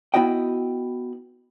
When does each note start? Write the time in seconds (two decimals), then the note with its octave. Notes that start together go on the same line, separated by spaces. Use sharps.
0.14 B3 E4 F#4 D#5 G5